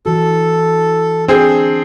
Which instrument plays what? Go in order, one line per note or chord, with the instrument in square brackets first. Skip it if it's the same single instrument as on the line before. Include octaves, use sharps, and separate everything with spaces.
[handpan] E3 F#4 [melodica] A4
[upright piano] C4 G#4 [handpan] D4